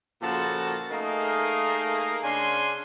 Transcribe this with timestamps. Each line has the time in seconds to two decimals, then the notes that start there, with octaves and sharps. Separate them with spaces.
0.22 A#2 C#3 F3 F#4 A4 A5
0.90 A3 A#3 D#4 G#4 A#4
2.23 C#3 C#4 D4 G#5 C6